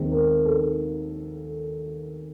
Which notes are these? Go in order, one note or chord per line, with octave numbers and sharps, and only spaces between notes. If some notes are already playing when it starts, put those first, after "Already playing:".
Already playing: D#2 D#3 G#3 C4
A#4
A4